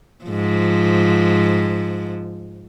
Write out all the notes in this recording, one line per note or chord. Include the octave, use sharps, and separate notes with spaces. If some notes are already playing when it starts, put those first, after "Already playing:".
G#2 F3